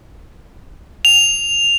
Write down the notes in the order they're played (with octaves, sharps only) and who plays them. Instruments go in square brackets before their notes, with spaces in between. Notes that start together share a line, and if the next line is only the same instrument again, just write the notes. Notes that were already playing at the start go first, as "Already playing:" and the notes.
[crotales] F7